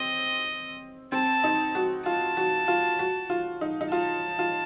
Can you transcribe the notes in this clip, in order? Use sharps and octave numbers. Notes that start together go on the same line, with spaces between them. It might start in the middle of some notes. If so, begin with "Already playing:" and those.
Already playing: C4 D#5
C4 A5
D#4
F#4
F4 A5
F#4
F4
F#4
F4
D#4
D#4
F4 A5
F4